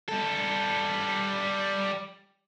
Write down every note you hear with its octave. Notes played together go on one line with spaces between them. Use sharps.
G3 A4